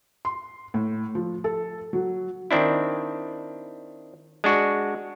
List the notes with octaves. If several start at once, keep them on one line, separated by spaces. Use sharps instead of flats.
C6
A2
F3
A4
F#3
D#3 C4 D4 E4
G#3 D4 F#4